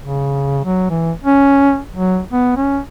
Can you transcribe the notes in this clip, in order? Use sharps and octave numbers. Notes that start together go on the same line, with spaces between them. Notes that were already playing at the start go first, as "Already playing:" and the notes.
C#3
F#3
E3
C#4
F#3
B3
C#4